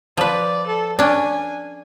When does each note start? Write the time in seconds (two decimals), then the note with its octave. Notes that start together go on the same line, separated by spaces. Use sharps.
0.17 F3 B4 D5
0.67 A4
0.99 C#4 D4 G#5